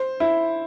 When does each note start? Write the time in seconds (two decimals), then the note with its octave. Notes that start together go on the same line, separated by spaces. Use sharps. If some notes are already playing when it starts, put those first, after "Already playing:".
Already playing: C5
0.20 E4